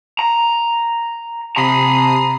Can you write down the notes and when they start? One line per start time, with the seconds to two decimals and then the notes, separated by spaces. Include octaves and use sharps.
0.19 A#5
1.56 C3 A#5 B5 D#6 C7